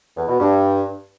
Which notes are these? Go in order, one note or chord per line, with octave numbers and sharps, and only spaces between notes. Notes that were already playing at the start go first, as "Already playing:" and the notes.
E2
B2
G2